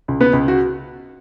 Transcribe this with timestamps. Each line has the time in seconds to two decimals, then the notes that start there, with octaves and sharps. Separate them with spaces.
0.08 C#2
0.21 B3 B4
0.33 C#2
0.48 F#4